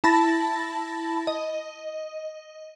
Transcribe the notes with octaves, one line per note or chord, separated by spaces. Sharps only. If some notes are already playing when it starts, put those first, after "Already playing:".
E4 A5 B5 A6 A#6
D#5